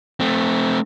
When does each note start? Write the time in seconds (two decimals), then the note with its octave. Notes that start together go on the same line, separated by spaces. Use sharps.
0.20 A3 C4